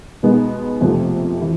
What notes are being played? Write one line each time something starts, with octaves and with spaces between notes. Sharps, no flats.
B2 G#3 B3 D#4
F2 C3 F3 A3
E3